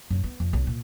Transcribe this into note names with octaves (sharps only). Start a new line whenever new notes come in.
F#2
B3
F2
B1
A#2